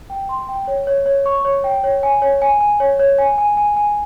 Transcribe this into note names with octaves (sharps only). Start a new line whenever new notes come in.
G5
C6
G5
C#5
C#5
C#5
C#6
C#5
G5
C#5
G#5
C#5
G#5
G#5
C#5
C#5
G#5
G#5
G#5
G#5